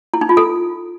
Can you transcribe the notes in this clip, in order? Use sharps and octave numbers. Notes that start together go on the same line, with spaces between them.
E4
D#4
F4
A4